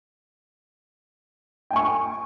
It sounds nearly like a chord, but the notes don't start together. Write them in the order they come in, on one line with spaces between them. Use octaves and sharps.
G5 G#5 C#6